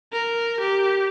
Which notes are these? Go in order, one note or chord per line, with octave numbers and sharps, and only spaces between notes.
A#4
G4